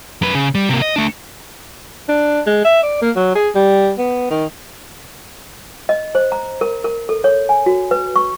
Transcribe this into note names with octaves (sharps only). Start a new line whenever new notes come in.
F#2 B4
C#3
G3
C3 A#3
D#5
A3 D4
D4
G#3
E5
D5
A#3
F#3
G#4
G3
B3
D#3
D#5
C5
A#5
A#4
A#4
A4
C#5
G#5
F#4
B4
C#6